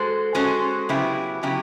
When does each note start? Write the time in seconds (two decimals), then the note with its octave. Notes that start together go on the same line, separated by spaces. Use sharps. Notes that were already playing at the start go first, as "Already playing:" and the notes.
Already playing: G#3 F#4 A4 C5
0.35 G#3 C#4 F#4 A4 C5
0.89 C#3 F#3 B3 E4 G4
1.43 C#3 F#3 B3 E4 G4